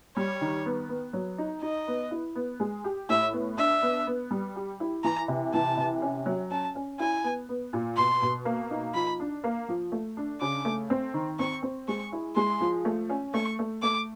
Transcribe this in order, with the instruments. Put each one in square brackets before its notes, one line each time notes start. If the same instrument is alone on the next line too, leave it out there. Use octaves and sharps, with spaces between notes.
[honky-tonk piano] G3 [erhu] C#5
[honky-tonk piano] D#3
B3
B3
F#3
D#4
[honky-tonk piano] D#4 [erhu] D#5
[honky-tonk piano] B3
E4
B3
G#3
G4
[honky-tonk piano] A2 [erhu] E5
[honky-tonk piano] B3
[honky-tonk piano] D4 [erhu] E5
[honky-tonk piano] B3
B3
G3
G4
E4
[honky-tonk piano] E3 [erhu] A#5
[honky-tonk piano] C3
[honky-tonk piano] E3 [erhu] A5
[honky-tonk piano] C3
C#4
F#3
[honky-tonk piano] C#4 [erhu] A5
[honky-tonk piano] C#4
[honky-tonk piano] E4 [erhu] G#5
[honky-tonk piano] B3
B3
A#2
[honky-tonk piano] B2 [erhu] C6
[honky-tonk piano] B2
A#3
D#4
[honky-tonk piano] F3 [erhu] B5
[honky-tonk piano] D4
A#3
F3
A3
D4
[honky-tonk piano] C#3 [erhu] D6
[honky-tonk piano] A3
C4
D#3
[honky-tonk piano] C4 [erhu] C#6
[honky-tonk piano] C4
[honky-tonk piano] G#3 [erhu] C#6
[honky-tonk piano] E4
[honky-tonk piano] G#3 [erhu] C6
[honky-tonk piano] F3
A3
C#4
[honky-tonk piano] A3 [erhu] C#6
[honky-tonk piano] A3
[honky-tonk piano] A3 [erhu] D6